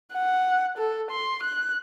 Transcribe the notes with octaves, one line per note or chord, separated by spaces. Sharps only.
F#5
A4
C6
F#6